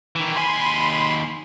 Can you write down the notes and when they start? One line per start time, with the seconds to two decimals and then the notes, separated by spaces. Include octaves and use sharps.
0.16 D#3 E3
0.36 D#2 G#5 B5 C6